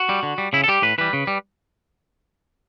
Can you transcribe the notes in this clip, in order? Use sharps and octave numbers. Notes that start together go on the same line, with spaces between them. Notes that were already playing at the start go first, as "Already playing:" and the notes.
Already playing: F#4
G3
D3
G3
C#3 E4
A4
G3 G4
A2 B4
E3 G3 B4
C#3
G3